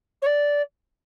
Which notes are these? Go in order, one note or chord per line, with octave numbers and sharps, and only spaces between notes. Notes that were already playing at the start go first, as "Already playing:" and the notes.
C#5
D5